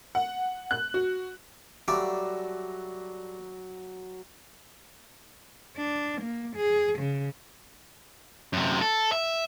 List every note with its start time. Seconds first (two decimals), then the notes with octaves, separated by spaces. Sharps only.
0.15 F#5
0.71 F#6
0.94 F#4
1.88 F#3 G3 A3 D5
5.77 D4
6.21 A#3
6.56 G#4
6.99 C#3
8.53 F#2 C3
8.81 A4
9.12 E5